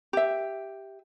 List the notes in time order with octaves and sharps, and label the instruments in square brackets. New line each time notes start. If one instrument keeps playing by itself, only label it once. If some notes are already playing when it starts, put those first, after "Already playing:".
[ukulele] G4 E5